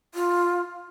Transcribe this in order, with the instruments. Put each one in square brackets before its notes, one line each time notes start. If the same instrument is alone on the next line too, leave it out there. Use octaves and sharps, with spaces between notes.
[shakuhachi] F4